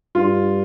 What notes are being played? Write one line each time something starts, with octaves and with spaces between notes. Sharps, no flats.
G2 F4